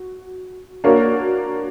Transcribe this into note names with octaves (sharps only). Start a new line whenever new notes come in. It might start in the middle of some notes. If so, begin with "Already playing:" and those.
Already playing: F#4
A#3 D4 F#4 A#4 C#5